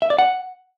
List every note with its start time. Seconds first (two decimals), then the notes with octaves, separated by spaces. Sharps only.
0.02 E5
0.10 D5
0.18 F#5